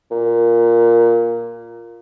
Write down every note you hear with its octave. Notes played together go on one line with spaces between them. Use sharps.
A#2